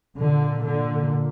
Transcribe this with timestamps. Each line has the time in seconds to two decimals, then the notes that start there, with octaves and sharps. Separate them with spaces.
0.18 A#2 D3
0.64 D3